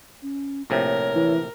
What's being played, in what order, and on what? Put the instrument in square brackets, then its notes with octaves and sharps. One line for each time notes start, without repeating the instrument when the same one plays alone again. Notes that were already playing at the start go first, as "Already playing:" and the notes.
[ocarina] C#4
[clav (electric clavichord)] A#1 A2 C3 [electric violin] A#4 [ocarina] C#5
[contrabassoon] E3